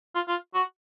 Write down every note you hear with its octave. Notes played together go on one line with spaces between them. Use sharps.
F4
F4
F#4